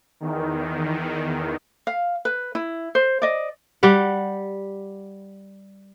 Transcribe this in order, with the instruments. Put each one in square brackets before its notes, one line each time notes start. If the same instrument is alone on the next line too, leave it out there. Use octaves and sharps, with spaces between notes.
[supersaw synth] E2 D#3
[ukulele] F5
B4
E4
C5
D5 D#5
[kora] G3 G4 F#5